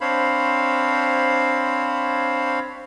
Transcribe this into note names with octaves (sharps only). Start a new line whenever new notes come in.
C4 D4 C5 C#5 F5 B5